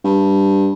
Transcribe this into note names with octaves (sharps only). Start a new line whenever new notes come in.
G2